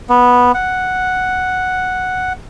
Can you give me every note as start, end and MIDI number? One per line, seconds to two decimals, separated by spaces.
0.09 0.52 59
0.54 2.33 78